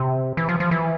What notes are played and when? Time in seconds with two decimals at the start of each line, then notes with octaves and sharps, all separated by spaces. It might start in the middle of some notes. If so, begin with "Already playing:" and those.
Already playing: C3
0.37 E3
0.49 F3
0.60 F3
0.71 E3